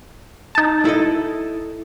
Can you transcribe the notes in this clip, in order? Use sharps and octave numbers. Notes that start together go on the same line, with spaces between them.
D#4 A5
E4 A4 D#5